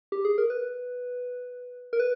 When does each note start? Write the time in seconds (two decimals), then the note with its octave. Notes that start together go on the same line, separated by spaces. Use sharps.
0.12 G4
0.25 G#4
0.38 A#4
0.50 B4
1.93 A#4
2.00 B4